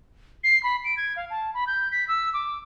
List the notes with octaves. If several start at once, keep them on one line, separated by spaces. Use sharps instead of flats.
C7
B5
D7
G#6
F5
A5
B5
G6
B6
E6
D6